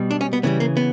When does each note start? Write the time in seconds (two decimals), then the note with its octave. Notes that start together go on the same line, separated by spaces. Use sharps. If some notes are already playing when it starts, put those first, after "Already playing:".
Already playing: B2 G3
0.11 D4
0.21 C#4
0.33 B3
0.43 C#3 E3 G3 B3
0.60 A#3
0.77 B3